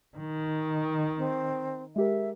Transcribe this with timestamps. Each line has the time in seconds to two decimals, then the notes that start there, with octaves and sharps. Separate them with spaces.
0.17 D#3
1.18 C4
1.96 G#3 G4 A#4 E5